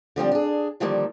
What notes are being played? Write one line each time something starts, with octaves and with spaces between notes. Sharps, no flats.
D3 F3 G3 C4
D4 G#4
D3 D#3 F3 G3 A#3